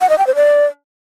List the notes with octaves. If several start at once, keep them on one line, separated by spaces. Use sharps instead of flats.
F#5
D#5
G5
C5
D5